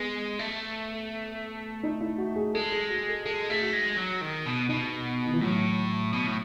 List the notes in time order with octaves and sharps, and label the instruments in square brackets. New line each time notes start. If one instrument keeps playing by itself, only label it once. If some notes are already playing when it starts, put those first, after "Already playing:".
Already playing: [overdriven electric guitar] G#3 [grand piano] B3
[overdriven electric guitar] A3
[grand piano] D#4
E4
F#4
G#4
[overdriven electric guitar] G#3 [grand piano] A4
[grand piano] G#4
F#4
A4
[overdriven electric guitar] G#3 [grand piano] A4
[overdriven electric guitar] A3 [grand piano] G#4
[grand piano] F#4
[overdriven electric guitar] G#3
F#3
D#3
B2
[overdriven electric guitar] B2 [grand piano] D#4
[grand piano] D#3
E3
[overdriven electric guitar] A2 [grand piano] F#3
[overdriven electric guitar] B2
A2